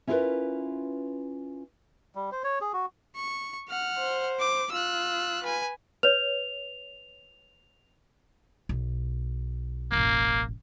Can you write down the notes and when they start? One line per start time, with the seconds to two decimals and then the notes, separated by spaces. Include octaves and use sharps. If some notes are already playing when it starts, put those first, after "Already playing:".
0.07 C#4 E4 F4 G#4 A#4 B4
2.15 G3
2.32 C5
2.44 C#5
2.61 G#4
2.73 F#4
3.16 C#6
3.69 F#5 F6
3.98 C5
4.40 D6
4.72 F4 E6 F#6
5.43 B4 G#5
6.03 B4 C#5 F7
8.69 B1
9.92 E1 A1 A#3